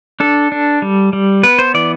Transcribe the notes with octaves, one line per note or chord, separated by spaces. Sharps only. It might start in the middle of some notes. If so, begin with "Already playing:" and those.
D4 A4
D4
G3
G3
B3 B4
C5
E3 D5